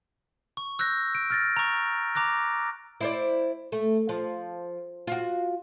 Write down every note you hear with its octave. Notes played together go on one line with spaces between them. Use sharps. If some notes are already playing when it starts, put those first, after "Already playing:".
C#6
E6 F#6 G6 A#6
D7
F6 A6 A#6
A#5 C#6
A#5 D6 F#6 A#6
E4 C5 D5
A3
F3
F4 F#4